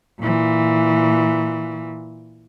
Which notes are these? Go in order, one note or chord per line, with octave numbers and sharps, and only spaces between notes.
A#2 E3